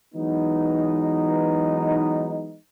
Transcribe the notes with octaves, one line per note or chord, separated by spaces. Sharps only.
E3 F#3 G#3 B3 D#4